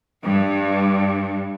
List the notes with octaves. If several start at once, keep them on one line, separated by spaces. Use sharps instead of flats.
G2